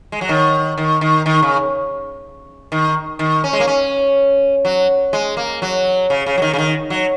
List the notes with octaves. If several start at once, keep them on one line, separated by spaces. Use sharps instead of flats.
G#3
F#3
D#3
D#3
D#3
D#3
C#3
D#3
D#3
C#4
G#3
A#3
C#4
F#3
G#3
A#3
F#3
C#3
C#3
F#3
D#3
C#3
D#3
F#3